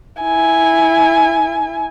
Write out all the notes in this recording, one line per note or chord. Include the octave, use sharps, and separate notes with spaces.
E4 G#5